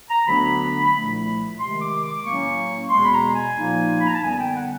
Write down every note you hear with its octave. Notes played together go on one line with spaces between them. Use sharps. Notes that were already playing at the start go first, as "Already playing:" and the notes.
A#5
D2 D3 F#3 B3 D4 B5
C2 A#2 F3 A3
C3 D#3 G#3 C6
D6
D6
A2 F#3 A#3 C#4 C#6
E2 B2 G#3 C6
B5
A#5
G#5
A#2 F3 A#3 D#4
B5
A#5
A5
F#2 D3 G3 B3 G#5
G5
F#5